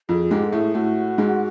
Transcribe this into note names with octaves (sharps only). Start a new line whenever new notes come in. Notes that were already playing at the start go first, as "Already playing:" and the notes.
F2 F3 G#4
G#2 G#3 G4
A4
A2 A3 G#4
A2 A3 F#4
G#2 G#3